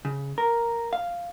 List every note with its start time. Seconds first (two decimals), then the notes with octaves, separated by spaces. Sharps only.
0.05 C#3
0.38 A#4
0.93 F5